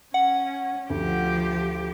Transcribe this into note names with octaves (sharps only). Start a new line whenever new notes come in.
C#4 F#5
D2 F3 G4